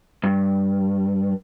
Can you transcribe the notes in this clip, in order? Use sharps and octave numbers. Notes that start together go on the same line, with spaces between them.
G2